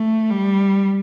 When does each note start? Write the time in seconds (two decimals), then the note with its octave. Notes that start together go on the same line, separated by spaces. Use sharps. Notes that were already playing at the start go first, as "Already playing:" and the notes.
Already playing: A3
0.30 G3